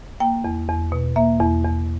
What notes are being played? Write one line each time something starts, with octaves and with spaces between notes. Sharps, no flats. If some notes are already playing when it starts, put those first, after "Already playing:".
A#3 G5
E2
E2
B2
A#3 E5
E2
E2